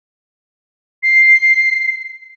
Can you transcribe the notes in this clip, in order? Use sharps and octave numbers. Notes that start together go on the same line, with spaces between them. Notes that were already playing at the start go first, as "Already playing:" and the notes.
C7